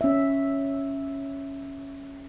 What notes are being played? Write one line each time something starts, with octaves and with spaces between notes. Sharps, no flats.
C#4 E5